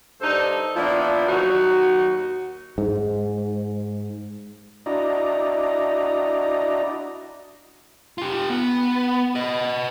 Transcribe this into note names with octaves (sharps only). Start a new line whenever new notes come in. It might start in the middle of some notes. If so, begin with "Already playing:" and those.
G2 D4 D#4 A4 C5
F3 A#3 B3 D4 E4
D#2 F#3 D#4 F#4
G#2
D4 E4 F#4 D5 D#5 A#5
F4 G4
B3
B4 D#5